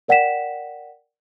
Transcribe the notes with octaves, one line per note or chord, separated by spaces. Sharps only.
A#4 D5 F#5 G5 B6 E7